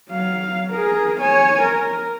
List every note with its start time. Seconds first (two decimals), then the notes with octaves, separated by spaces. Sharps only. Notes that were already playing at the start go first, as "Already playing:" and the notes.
0.11 F#3 F5
0.71 G#4 A#4
1.20 C#5 G#5
1.62 A#4